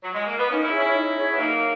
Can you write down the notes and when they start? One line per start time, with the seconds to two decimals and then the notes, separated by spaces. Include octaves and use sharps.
0.04 F#3
0.14 G#3
0.27 A#3
0.39 B3
0.50 A#3 C#4 D#4
0.64 C#4 E4
0.72 G#4 C#5 E5
0.79 C#4 E4
0.94 D#4
1.17 G#4 C#5 E5
1.31 B3
1.39 F#3 A#3 D#4